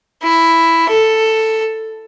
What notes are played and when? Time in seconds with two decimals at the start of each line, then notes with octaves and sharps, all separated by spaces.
0.23 E4
0.90 A4